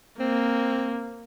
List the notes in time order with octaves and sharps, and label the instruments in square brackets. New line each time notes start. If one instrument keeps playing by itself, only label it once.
[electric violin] A#3 [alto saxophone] C4